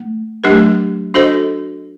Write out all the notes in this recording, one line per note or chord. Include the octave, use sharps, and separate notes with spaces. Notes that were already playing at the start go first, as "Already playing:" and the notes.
Already playing: A3
F#3 A3 D4 G4 A#4
D4 F#4 A4 C5 D#5